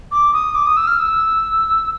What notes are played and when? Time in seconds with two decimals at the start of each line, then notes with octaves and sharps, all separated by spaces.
0.12 D6
0.33 D#6
0.55 D6
0.66 D#6
0.77 E6
0.87 F6
0.98 E6